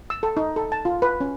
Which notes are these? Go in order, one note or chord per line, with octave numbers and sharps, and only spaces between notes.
E6
A4
D#4
A4
A5
F4
B4
C#4